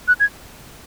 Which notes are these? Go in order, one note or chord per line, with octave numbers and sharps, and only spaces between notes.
F#6
G#6